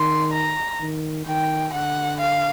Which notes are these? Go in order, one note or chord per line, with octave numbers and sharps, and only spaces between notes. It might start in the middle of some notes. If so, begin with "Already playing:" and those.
Already playing: D#3 C6
A#5
D#3
D#3 G5
D3 F#5
F5